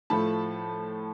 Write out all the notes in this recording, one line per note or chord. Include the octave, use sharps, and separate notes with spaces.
A2 F3 A3 A5 B5